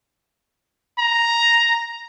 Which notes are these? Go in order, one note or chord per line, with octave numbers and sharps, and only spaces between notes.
A#5